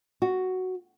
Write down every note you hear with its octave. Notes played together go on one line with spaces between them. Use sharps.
F#4